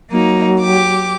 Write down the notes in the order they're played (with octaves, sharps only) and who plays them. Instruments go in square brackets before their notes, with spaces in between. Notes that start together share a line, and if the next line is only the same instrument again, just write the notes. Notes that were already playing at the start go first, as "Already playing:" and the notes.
[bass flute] F#3 [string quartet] A#3 D#4
[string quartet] G4 D6